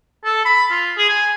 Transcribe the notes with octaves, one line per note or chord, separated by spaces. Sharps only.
A4
B5
F4
G#4
G#5